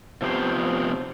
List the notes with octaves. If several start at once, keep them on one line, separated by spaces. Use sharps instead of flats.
C3 F3 B3 G4 C5